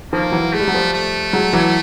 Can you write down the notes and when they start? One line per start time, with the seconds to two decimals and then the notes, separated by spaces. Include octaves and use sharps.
0.13 D#3 F3 A#3
0.32 E3 F#3
0.53 G#3 A3
0.60 G3
0.67 F#3
0.74 F3 G3
0.93 A3
1.33 F#3 G#3
1.53 E3 F#3